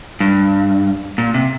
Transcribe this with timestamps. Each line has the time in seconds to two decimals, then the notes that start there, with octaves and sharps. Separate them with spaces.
0.20 G2
1.18 A#2
1.34 C3